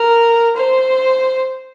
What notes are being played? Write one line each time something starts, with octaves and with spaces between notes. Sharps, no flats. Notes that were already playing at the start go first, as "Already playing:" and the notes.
Already playing: A#4
C5